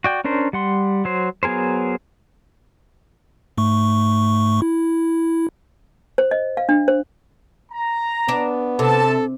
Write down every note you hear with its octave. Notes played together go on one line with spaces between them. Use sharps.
F#4 D5 G5
C#4 D4 A#4 C5
G3 F#5 C6
F#3 C5
F#3 B3 G#4 A#4 C5
G#2 A3 C#6
E4
C5
D#5
F5
D4
C5
A#5
B3 D4
C3 A4 A5